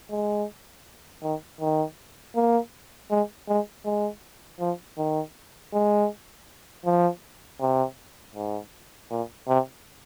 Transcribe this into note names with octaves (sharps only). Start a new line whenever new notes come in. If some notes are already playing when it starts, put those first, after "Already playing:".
G#3
D#3
D#3
A#3
G#3
G#3
G#3
F3
D#3
G#3
F3
C3
G#2
A#2
C3